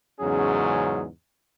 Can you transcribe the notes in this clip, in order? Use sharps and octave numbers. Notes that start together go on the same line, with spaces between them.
E2 G#2 C#3 F#3 C#4 G#4